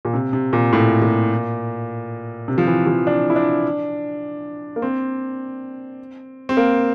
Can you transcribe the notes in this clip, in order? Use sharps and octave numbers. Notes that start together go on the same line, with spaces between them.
A#2
C3
C3
A#2
A2
A#2
C3
F3
E3
F3
D4
E4
D4
A#3
C4
C4
A#3